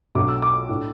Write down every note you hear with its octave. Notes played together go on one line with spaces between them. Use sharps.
B1 B2 F#3 A3 D4 D6
E6
D6
A2 A3 D4